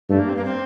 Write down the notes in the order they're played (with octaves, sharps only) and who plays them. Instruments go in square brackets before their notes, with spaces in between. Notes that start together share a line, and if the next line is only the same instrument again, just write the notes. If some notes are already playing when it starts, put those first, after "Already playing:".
[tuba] G2 [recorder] A3
[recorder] A#3
C4
A#3
C4